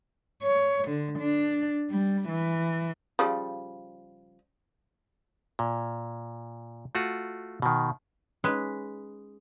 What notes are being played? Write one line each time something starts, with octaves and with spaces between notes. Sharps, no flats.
C#5
D3
D4
G3
E3
C#3 F3 G3
A#2
A3 F4 F#4
B2 D#3
G#3 C#4 D#4 B4